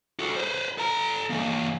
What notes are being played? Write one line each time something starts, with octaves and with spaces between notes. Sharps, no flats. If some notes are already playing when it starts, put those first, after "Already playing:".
F#4 A4
B4 C5
A4 A#5
E3 A#3